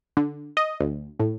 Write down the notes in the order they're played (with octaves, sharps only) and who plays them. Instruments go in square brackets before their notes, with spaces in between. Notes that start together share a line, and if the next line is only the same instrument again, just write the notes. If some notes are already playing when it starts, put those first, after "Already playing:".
[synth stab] D3
D#5
D2
A2